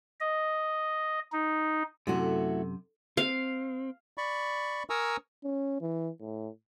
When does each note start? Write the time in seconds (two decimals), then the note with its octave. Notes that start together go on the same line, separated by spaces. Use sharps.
0.20 D#5
1.32 D#4
2.07 F#2 C3 A3 E4 F#4
3.17 C4 F5
4.18 D5 B5 C#6
4.90 A#4 G#5 A#5 C#6 D#6 E6
5.44 C#4
5.81 E3
6.21 A2